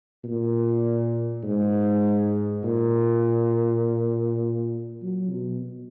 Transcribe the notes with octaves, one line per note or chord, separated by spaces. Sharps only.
A#2
G#2
A#2
F#3
B2